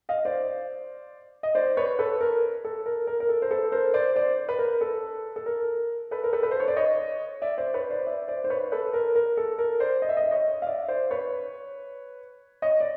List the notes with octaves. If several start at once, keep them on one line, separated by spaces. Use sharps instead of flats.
D#5 F5
C5 D5
D#5
C5 D5
B4 C#5
A4 B4
A#4
A4
A#4
A#4
A#4
A4
C5
A4 B4
A#4 C5
C5 D5
C5 D5
B4
A#4
A4
A4
A#4
A4 B4
A#4
A4 B4
B4
C5
C#5
D5
C#5 D#5
D5 E5
C5 D5
B4 C#5
C5 D5
D5 E5
C5 D5
C5
B4 C#5
A4 B4
A#4
A#4
A4
A#4
C5 D5
D#5
E5
D#5
E5
C#5 D#5
F5
D5 E5
C5 D5
B4 C#5
C#5 D#5
D5